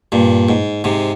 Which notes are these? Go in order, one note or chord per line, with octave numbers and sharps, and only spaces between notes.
G2 A#2
G#2
G#2 C3